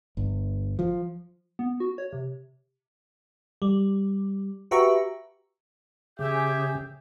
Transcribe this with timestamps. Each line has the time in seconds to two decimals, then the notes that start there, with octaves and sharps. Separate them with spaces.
0.17 G1
0.79 F3
1.59 B3
1.80 F#4
1.98 C#5
2.13 C3
3.62 G3
4.71 F#4 G4 B4 E5 A#5 C#6
6.19 C#3 G4 G#4 E5 D6 G6